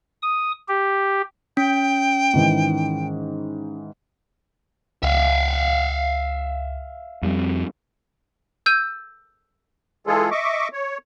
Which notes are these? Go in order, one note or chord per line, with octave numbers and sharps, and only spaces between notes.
D#6
G4
C#4 G5
G#2 D#3 E3
C#2 E5 F5
F2 G3 C4
E6 G6 D#7
E3 G#3 F4 G#4 A4
D#5 E5 C#6 D6
C#5